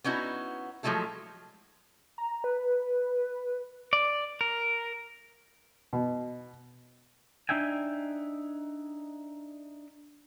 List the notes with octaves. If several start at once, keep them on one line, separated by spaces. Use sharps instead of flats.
B3 C#4 D#4 E4 F#4
F3 F#3 G#3 A3 E4 A4
A#5
B4
D5
A#4
B2
D4 D#4 E5 G5 G#5